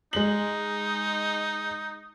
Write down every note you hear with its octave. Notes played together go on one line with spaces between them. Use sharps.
G#3 D#4 F#7